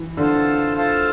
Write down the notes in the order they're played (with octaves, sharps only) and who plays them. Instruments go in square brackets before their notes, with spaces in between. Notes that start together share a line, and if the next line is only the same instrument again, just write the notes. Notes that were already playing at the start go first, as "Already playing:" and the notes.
Already playing: [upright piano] E3
[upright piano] D3 [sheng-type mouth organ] F4 A4 C5 F5 A5
[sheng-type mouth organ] F4 A4 C5 F5 A5